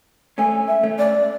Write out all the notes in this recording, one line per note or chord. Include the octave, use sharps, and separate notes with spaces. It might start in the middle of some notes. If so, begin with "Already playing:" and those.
A3 C#4 G#5
E5
A3 C#4
D5